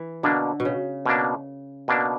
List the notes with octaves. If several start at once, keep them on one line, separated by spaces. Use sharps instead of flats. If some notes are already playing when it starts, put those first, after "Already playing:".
Already playing: E3
B2 D3 A#3 D4
B2
C#3
B2 A#3 D4
B2 A#3 D4